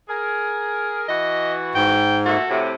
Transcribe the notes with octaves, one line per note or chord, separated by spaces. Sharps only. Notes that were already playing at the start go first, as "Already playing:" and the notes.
G#4 A#4
E3 F#4 D#5
G#2 G5
A#2 A3 F#4 A4
A2 C3